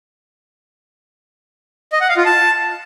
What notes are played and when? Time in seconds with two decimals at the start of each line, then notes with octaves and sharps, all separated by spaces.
1.93 D#5
2.01 F#5
2.09 F5
2.17 F4
2.25 A5